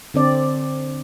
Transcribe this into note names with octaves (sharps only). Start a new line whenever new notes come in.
D3 C4 D5